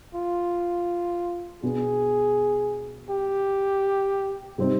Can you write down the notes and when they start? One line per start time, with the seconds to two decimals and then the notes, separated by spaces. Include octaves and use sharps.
0.15 F4
1.62 B2 B3 D4 G#4
3.10 G4
4.58 C3 G3 C4 D#4